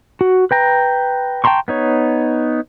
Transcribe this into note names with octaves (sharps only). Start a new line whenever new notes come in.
F#4
B4 G5 A#5
G5 A5 A#5 C6 C#6
B3 D#4 C#5